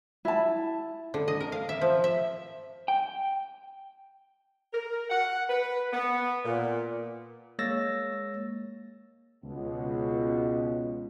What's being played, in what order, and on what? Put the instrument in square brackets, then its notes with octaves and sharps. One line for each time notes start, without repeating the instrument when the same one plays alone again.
[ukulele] E4 A5
[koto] D3
D#5
A#4
F5
E5
F3
E5
[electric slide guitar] G5
[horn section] A#4
F#5
B4
B3
A#2
[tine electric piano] G#3 A#3 C#5 E6 A6 A#6
[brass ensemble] C#2 B2